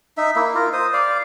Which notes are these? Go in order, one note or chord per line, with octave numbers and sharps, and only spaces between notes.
D#4 E5
A#3 E4
F4 A#4
C5 D#6
D5 F5